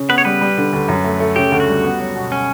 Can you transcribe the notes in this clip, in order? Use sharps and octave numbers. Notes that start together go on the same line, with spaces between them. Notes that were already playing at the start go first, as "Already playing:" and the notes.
Already playing: C#3
B3 B4
C#5
G3 B4
G3
D3
D2
F#2
A3
A3
C#3 G4
D2
F#4
G3
B3
F#3
B2
C#4